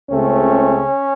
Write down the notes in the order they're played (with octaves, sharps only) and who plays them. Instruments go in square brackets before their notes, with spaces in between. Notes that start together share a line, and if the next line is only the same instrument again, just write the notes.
[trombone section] C#2 C#3 A3 C4 C#4